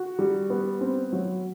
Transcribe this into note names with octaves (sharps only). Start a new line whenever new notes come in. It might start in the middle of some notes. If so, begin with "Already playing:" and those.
Already playing: F#4
G3
B3
C4
F#3